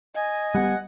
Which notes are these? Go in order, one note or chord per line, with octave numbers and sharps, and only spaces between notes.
D#5 G#5
G3 B3 F#5